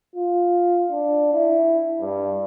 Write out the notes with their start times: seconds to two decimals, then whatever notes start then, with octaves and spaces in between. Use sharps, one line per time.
0.16 F4
0.91 D4
1.33 E4
2.01 G2